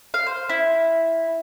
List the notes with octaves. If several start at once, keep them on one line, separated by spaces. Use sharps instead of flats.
F5
C5
E4